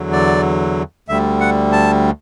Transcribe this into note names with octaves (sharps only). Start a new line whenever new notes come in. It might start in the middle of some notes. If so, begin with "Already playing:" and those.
Already playing: E2 D3 F#3
D5
D2 D3 G3 E5
F#5
A5